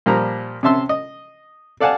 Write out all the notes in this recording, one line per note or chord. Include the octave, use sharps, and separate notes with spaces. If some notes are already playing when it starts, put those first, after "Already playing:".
A#2 F3 G3 A#5
C3 C#4 E5 A5 C6 E6
D#5
A4 D5 F5 F#5 G#5 A5